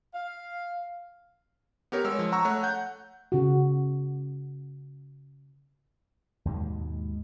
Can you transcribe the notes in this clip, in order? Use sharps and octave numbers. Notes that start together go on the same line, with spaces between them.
F5
B3 G4 A#4 C#5
G#3 C#5 E6
F3
F#5 A#5 C#6 E6
A3 C#5 F#6
F#5 G6
C#3 F#4
D#2 G#2 B2 G#3